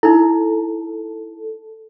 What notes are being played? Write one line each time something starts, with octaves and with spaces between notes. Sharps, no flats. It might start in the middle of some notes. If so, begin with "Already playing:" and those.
D#4 E4 A4